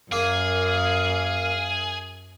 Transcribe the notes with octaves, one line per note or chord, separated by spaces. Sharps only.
F#2 A#3 G#4 F5